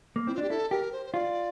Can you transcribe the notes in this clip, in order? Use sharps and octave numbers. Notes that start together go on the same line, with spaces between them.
A#3
C4 E4
F4
D4 G4
E4 A4
G4 A#4
C5
C5
F4 D5